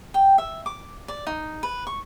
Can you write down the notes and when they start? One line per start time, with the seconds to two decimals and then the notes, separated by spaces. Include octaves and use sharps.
0.14 G5
0.38 E5
0.66 D6
1.08 D5
1.27 D#4
1.63 B4
1.87 C#6